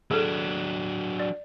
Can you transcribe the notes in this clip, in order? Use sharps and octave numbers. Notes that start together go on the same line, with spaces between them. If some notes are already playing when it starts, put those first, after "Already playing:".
F#3 D4 G#4 A4
D5